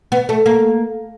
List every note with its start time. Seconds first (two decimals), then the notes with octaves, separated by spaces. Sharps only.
0.12 B3
0.29 A3
0.46 A#3